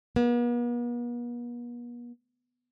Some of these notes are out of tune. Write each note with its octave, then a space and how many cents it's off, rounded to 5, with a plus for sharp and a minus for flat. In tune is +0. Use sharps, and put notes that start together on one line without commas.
B3 -45